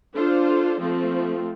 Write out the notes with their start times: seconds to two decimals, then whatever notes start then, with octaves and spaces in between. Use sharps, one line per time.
0.15 D4 F4 A4 C5
0.80 F3 A3 C4 F4